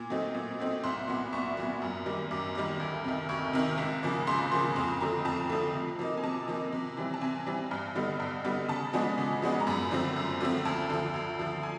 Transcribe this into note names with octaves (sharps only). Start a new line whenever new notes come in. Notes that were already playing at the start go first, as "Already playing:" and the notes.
Already playing: A#2
F#3 A3 C4 D#4
A#2
F#3 A3 C4 D#4
C2 C6
A#2 F#3 B3
C2 C#6
A#2 F#3 B3
F#2
D#3 G3 A#3
F#2 D6
D#3 G3 A#3
D2
C3 D#3
D2 C#6
C3 D#3
C#2
C#3 F3 A#3
C#2 C6
C#3 F3 A#3 C6
F2
D3 F3 A3 A#5
F2 A5
D3 F3 A3
C3
F3 A#3 D#4
G#5
C3 A5
F3 A#3 D#4
C3
E3 G3 C4
A5
C3 G#5
E3 G3 C4
G2
D3 G3 B3 D#4
G2
D3 G3 B3 D#4
C#3 A5
F3 G#3 B3 D4
C#3
F3 G#3 B3 D4
A#5
F#2 B5
D3 F3 A3 C4
F#2
D3 F3 A3 C4
D2 A5
D3 F3
D2
D3 F3
G#5